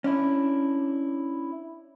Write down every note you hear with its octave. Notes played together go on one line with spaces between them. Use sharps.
C#4 D4 E4